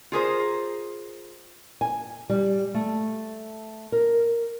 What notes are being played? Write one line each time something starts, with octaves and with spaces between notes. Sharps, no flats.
F4 G#4 A#4 C5
G#5
G3
A3
A#4